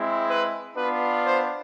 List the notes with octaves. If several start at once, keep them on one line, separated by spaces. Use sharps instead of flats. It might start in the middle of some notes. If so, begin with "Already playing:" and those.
Already playing: G#3 C4 E4
B4
B3 D4 F4 B4
C5